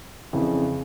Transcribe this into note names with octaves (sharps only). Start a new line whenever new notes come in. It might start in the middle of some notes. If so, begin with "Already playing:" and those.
F2 C#3 E3